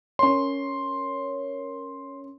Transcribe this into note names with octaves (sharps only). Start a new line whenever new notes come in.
C#4 A#4 C#5 C6